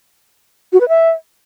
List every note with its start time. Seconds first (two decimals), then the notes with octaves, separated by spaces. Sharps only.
0.73 F#4
0.81 B4
0.89 E5